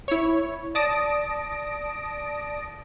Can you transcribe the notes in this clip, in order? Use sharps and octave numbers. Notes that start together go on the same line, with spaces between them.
E4 C#5
D5 A5 D#6 A#6 D7